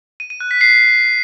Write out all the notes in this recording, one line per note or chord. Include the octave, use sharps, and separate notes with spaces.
D#7
D#7
F#6
B6
C7